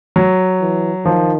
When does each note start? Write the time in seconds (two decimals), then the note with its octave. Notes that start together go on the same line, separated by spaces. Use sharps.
0.16 F#3
0.61 E3
1.05 D#3 F3